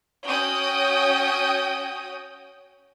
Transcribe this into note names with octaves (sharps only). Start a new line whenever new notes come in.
C#4 F#4 G5 D#6